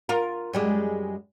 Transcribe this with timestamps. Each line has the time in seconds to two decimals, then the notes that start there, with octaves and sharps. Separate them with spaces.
0.09 F4 A#4
0.53 F#2 G3 G#3